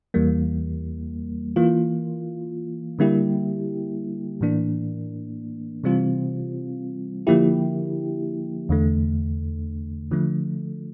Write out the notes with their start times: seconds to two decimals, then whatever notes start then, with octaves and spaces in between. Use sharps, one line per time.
0.14 E2 E3 G3 A#3
1.56 E3 A#3 F4
2.99 D3 G3 A#3 E4 G4
4.41 A2 E3 A#3 D4
5.84 C3 E3 G3 C4 F4
7.27 D3 F3 A#3 E4 G4
8.69 E2 D3 A3
10.11 D3 F3 A3